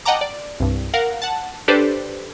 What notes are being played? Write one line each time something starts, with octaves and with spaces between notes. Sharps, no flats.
D#5 F#5 G5 A5 A#5 D6
D5
C2 G2
A#4 F5 F#5
F#5 A5
D4 G4 A4 B4 C5 D5